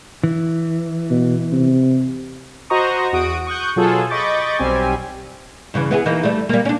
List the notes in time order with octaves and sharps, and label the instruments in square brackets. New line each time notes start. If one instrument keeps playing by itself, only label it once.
[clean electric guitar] E3
[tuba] B2
C3
[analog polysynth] F#4 C5 D#5 A#5 C#6 D#6
E2 F#4 D#6 D7
C#6 D#6 F#6 G6
B2 F#3 F4 G#4 A4
D#5 B5 C#6 D6 G6 A6
B1 G3 C4 G4 G#5
[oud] G2 C#3 E3
B3 E4 G#4
E3 A#3 D#4
G3 A3
G3 A#3
C#4 D4